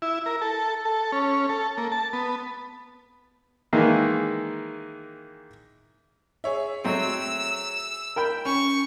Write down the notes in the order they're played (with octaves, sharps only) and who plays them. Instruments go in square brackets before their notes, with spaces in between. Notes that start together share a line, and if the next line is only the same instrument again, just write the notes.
[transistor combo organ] E4
A#4
A4
A4
C#4
A4
A#3
A5
B3
[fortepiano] D#3 E3 G#3 A#3
[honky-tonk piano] G#4 C#5 E5
[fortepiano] F#3 A3 C4 [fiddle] E6
[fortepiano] A#4 G5 B5
[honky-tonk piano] C#4 [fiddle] C#6